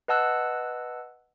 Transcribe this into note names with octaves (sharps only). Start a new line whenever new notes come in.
B4 D#5 F#5 A5 E6 F#6